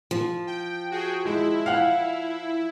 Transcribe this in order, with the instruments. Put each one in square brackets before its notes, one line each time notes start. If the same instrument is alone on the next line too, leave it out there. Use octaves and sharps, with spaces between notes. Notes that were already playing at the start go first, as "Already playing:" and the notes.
[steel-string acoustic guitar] F3
[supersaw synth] G5
F#4 G#4 G5
[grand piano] G#3 [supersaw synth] E4
[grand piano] F5 F#5